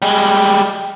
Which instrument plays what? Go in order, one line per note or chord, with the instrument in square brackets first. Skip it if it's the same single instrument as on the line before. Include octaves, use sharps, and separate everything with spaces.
[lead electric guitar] G3 G#3